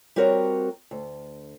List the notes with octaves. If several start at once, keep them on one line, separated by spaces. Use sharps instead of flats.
G3 C4 F#4 A#4 C#5
D2